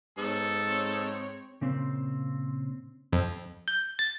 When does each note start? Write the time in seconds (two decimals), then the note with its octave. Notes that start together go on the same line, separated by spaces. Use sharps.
0.18 G#2 B3 A4 C#5
0.64 C4 C#5
1.61 A#2 C#3 C4 C5
3.13 F2
3.68 G6
3.99 A6